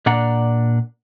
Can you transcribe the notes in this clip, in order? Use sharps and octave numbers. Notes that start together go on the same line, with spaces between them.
A#2 D4 D5 F#5 A#5